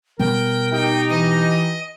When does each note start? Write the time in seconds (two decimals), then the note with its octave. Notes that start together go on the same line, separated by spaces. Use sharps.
0.19 B2 G3 B3 A#4 G5
0.72 D#4 G4 G5
1.09 E3 D#5